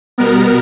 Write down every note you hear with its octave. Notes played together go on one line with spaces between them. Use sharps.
B2 G3 B3 A#4